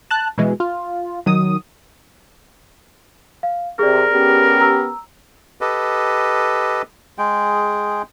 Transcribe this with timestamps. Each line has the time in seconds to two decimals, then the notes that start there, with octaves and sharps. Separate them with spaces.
0.11 A5 F#6
0.38 B2 E3 G#3
0.60 F4
1.26 D#3 F#3 D#6
3.43 F5
3.79 C3 G#4 A#4 D5
4.12 B3 C#4 G4
4.60 A#5 E6
5.61 G4 A4 B4 D#5
7.18 G#3 G#4 G5